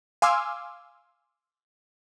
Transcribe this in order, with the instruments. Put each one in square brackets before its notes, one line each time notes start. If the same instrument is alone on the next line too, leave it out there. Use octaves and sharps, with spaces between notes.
[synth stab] F5 G#5 C6 D6 E6 F6